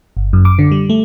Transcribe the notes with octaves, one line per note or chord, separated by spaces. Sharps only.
G1
F#2
D6
D3
G3
A3